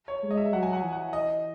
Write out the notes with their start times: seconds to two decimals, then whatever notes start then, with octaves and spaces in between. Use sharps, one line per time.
0.08 C#5
0.23 G#3
0.31 D#5
0.38 E5
0.53 F#3 F#5
0.63 G#5
0.73 F#5
0.83 E3
0.93 F#5
1.13 D#5